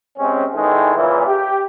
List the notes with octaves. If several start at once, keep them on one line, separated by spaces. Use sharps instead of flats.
C3 G#3 C4 C#4
E2 D#3 E3 G#3 A3 D#4
A#2 C#3 E3
G4